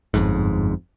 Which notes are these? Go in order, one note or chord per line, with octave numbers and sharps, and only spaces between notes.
G1 F2 G#2